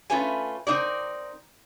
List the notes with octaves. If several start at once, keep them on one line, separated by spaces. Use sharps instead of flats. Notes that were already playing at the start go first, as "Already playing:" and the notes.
A3 C#4 F4 B4 C#5 G#5
C4 D#4 A#4 D5